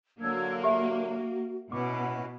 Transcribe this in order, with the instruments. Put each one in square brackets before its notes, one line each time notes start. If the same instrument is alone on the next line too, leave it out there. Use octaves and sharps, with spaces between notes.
[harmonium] D3 F#3 D4 [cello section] A#3 [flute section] F#4 E6 G#6
[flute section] F#4 [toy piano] G4 E5
[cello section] B2 [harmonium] C#4 E4 F#4 [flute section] F#5 [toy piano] D6